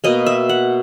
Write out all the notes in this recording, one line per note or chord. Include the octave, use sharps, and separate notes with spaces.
B2 A#3 D#5
E5
F#5